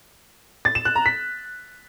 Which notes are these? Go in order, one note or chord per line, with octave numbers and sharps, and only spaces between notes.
A6
E7
F#6
A#5
B6